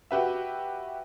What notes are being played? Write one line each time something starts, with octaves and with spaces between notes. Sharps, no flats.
F#4 G4 B4 E5